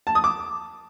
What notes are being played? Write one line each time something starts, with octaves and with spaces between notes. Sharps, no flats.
A5
D#6
D6